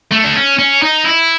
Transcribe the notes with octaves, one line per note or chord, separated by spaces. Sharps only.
A3
D4
C#4
C#4
D#4
E4